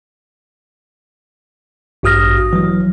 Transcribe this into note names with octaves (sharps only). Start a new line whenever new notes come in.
A1 G2 F#4 D#6 F6 A#6
E3 F#3